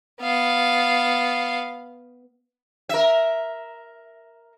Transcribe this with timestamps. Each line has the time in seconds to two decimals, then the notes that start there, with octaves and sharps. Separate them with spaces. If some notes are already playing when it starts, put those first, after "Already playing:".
0.20 B3 F5
2.89 A#4 E5